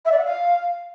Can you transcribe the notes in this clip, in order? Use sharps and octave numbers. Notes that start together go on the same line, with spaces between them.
E5
D5
F#5
F5